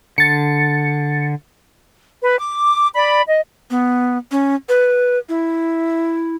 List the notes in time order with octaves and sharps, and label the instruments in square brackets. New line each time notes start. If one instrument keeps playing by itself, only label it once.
[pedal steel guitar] D3 [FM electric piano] A6 C#7
[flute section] B4
D6
D5 B5
D#5
[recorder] B3
C#4
B4
E4